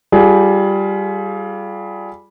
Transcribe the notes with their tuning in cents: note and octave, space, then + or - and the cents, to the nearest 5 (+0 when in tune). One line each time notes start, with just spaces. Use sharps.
G3 +0 F4 +0 G#4 +25